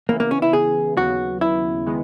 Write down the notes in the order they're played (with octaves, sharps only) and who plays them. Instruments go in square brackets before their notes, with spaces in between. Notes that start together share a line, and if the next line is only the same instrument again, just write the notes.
[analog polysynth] C#3 E3 B3 E4 [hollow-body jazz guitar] A#3
[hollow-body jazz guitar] A#3
C#4
E4
G#4
[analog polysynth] D#2 C#3 F#3 B3 [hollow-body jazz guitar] F#4
[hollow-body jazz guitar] E4
[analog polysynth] D#3 G#3 B3